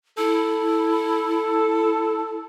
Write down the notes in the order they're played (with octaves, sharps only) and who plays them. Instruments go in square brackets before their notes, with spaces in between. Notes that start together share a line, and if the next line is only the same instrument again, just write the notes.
[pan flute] E4 [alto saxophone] A4